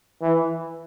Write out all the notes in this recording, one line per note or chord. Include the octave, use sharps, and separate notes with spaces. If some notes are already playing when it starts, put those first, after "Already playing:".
E3